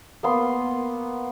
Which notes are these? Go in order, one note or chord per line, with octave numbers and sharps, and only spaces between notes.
A#3 B3 C6